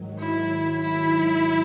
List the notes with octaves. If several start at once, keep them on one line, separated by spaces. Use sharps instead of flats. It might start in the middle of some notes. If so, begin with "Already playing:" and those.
Already playing: G#2 D#3 F#3
E4
E4